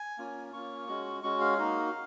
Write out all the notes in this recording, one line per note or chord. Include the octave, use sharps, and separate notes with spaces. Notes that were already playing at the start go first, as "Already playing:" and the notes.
Already playing: G#5
A#3 C#4 F4
A#3 C#4 F4 C#6
G#3 C#4 F#4
G#3 C#4 F#4 C#6
F5
A#3 D#4 F#4